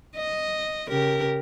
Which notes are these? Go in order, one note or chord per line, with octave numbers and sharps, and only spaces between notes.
D#5
C#3 G4 A#4